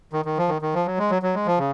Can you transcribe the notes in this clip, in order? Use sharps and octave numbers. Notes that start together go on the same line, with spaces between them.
D#3
D#3
F3
D#3
D#3
F3
F#3
G#3
F#3
F#3
G#3
F3
C#3